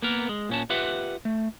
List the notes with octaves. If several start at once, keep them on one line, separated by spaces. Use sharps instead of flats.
A#3 B3 A#4
G#3
A#2 C#4 A5
F4 G4 B4 E5 F#5
A3